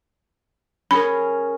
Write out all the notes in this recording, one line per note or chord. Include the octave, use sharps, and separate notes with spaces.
C#4 G#4 A#4 B5